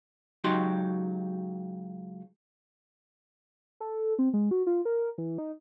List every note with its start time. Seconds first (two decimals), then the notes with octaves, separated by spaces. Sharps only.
0.44 C#2 F#3 D#4 F#4 G4 C6
3.80 A4
4.19 C4
4.34 G#3
4.51 F#4
4.67 F4
4.85 A#4
5.18 E3
5.38 D#4